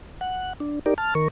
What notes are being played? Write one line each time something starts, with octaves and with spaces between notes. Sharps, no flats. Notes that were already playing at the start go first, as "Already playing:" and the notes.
F#5
D4
D#4 G4 A#4 D5
A5 F6
D#3 A#4 C#6